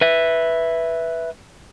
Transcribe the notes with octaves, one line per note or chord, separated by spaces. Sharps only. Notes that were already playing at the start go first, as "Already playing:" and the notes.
B4 E5